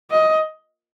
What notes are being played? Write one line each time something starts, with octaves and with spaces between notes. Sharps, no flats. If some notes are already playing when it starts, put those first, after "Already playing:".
D#5